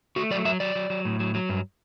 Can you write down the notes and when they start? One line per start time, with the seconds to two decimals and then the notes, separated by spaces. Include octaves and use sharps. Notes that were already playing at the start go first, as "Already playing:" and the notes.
0.16 A3 F#4
0.31 F#3 D5
0.45 F#3 E5
0.60 F#3 D5
0.75 F#3
0.90 F#3
1.05 A2
1.20 F#3
1.35 F#3
1.49 G2